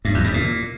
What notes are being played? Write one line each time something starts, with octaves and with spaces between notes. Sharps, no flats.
G2
E2
G#2
A#2